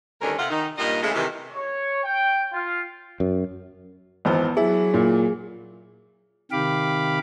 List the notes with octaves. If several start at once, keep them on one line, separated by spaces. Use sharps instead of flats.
D2 G2 D3 D#3 C#4 A#4
C3 F4 F#5
D#3 D#4
G2 A#2 D#4 A#4 D#5
C#3 E3 G#3 A3
C3 D#3 E3
C#5
G5
F4
F#2
G#1 E2 B3 C5
F#3 E4 G#4
A#2
C3 D#3 G4 F5 B5 D6